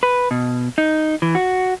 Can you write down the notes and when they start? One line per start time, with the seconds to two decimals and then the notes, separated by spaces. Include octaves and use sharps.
0.03 B4
0.31 B2
0.78 D#4
1.22 E3
1.35 F#4